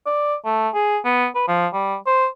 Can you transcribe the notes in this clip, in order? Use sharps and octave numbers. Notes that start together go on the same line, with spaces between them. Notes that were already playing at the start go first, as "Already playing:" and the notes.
D5
A3
G#4
B3
B4
F3
G3
C5